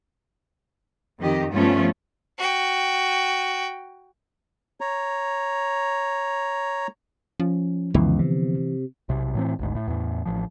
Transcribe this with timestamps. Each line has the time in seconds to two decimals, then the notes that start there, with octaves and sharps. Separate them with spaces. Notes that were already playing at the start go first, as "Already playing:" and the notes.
1.19 F2 D#3 G4 D#5
1.53 G2 F3 A3 B3 C#4 F4
2.38 F#4 G5
4.81 C#5 A#5
7.40 F3 C#4
7.94 C#2 F#2 D3 E3 F3 B3
8.19 C3
9.09 B1 C3
9.35 A2 E3 C4
9.59 G#1 D2 G#2
9.75 A2
9.88 E2 A2
10.25 A1 F3